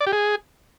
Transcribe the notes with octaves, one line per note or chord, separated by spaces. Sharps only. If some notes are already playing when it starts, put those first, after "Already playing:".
D5
G4
G#4